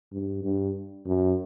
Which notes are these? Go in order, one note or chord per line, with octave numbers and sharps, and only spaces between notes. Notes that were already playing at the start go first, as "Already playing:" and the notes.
G2
G2
F#2